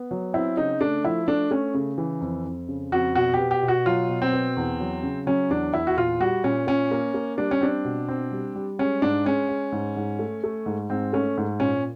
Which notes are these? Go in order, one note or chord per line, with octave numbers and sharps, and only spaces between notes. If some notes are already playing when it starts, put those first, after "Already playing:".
Already playing: B3
F#3
C4 E4
C#3 D#4
A3 D4
F3 E4
A3 D4
A3 C#4
C#3
E3
F2
F2
C#3
F2 F#4
B2 F#4
G4
B3
G4
B2
F#4
F#3 F4
B2
C4
B3
E2
F#3
C#3
F#3 C#4
E2 D4
E2 E4
F#4
A#2 F4
G3 F#4
A#2 C#4
A#2 C#4
A#3
A#3
G3 D4
C#4
C4 D4
B2
C4
G3
G3
G#3 C#4
G#2 D4
G#3 C#4
G#3
G#2
G#2
A3
A3
G#2
G#2 C4
A3 C#4
G#2
A#2 C#4